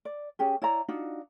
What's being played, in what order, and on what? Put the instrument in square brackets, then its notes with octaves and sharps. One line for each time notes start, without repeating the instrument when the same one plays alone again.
[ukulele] D5
C#4 G4 G#4
E4 C#5 D5 A#5
D4 D#4 F4 F#4